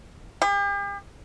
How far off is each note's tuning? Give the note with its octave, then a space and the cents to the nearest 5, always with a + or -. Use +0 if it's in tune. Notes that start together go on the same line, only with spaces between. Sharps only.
G4 +45